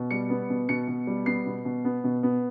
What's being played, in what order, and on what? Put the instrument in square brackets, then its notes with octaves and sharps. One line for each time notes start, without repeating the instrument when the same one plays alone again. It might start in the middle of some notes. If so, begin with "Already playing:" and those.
Already playing: [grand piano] B2
G3 C#7
B3
B2
B2 C#7
B2
G3
B3 C7
B2
B2
B3
B2
B3